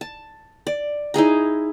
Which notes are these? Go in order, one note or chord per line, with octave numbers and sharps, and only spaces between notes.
A5
D5
D#4 E4 G#4 A#5